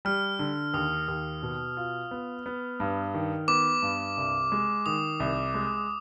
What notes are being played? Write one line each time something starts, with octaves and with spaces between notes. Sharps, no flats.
G3 F6
D3
D#2 D#6
D#2
B2
F4
B3
B3
G2
D#3
B3 D6
G2
C2
G#3
D#3 D#6
C2
G#3